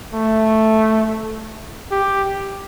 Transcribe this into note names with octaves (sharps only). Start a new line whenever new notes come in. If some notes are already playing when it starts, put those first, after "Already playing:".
A3
G4